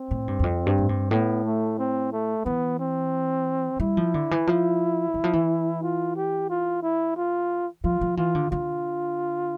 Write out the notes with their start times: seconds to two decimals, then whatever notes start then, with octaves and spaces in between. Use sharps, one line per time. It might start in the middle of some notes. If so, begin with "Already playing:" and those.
Already playing: C4
0.11 A2
0.28 G2
0.39 E2
0.44 F2
0.67 G2
0.78 A2
0.89 G2
1.11 A2 B3
1.45 A3
1.79 C4
2.12 A3
2.45 E3 B3
2.80 C4
3.80 G3 E4
3.97 F3
4.14 D3
4.31 E3
4.47 F3
5.14 E3
5.24 F3
5.33 E3
5.82 F4
6.16 G4
6.50 F4
6.83 E4
7.16 F4
7.84 F3 F4
8.01 F3
8.17 E3 F4
8.35 D3
8.51 D3 F4